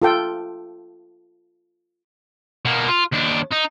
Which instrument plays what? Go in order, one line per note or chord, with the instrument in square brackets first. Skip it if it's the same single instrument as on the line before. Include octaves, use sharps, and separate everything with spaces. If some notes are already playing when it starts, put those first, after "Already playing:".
[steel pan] F4 A4 G5
[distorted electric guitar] B2 A#3
F4
D#2 D4
D#4